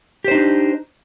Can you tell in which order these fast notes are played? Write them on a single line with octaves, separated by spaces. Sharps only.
G4 C5 D#4 D4